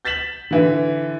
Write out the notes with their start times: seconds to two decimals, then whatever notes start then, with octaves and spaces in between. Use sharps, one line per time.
0.05 G6 A6 B6 E7 F#7
0.51 D3 E3